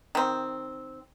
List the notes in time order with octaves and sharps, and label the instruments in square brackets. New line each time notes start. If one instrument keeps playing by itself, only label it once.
[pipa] D#3 C4